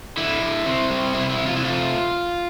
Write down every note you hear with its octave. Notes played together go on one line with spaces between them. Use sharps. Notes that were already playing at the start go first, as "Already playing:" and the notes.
D3 E4
D3
C4
G3
C3 E4
E4
C3
F4
E4
A3 F4